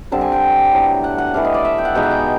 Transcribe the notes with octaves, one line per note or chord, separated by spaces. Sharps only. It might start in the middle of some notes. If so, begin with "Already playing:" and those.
D3 G3 C4 A5
G#5
G5
A2 F#3 B3 D4
F#5
F#5
E3 A3 D4 F5
D#5
D5
E5
G5
F#5
B2 G#3 B3 D#4 G5
F#5
G5